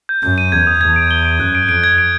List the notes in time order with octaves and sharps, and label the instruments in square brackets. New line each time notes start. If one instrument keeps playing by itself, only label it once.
[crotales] G6
[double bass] F#2 [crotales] G6
[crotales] D#7
[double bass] E2 [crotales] G#6
[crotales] D#6
[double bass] E2 [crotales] G#6
[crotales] D7
G7
D7
[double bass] F#2 [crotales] F#6
[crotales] D7
[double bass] F2 [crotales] D7
[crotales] G#6
D7